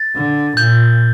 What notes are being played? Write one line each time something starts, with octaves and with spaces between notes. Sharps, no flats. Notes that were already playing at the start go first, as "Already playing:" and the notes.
Already playing: A6
D3
A#2 G6